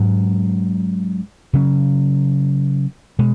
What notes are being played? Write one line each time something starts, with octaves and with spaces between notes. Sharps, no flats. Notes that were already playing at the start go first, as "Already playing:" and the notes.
Already playing: G#2 F#3 C#4
C#3 F#3 C#4
B2 G#3